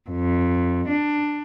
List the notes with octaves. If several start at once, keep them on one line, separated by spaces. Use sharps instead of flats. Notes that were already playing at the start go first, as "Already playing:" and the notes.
F2
D4